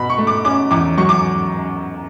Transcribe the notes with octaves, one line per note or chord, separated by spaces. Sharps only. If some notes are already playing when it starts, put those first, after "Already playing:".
Already playing: B2 B5
C#6
A3
D6
C#4 D6
E2 D6
F#3 C#6
D6